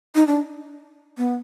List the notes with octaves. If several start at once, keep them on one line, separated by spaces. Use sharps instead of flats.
D#4
D4
B3